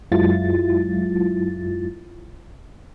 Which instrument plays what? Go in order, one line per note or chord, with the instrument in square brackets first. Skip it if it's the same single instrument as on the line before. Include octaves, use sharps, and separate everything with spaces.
[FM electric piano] F#2 F#3 G#3 E4 F4 A6